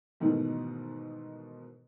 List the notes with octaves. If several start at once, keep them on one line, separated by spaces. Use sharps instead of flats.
G#2 B2 D#3 E3 A3